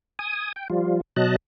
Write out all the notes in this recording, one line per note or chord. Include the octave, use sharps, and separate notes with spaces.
G#5 D#6
G5
F3 G3 F4
B2 F#3 D#5 A5 F#6